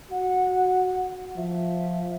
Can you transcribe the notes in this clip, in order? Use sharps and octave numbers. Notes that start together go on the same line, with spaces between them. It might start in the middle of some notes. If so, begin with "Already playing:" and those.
F#4 F#5
F3 E5